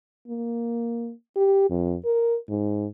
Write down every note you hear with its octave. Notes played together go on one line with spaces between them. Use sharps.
A#3
G4
F2
A#4
G#2